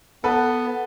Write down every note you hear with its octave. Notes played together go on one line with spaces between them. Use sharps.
B3 A4 B4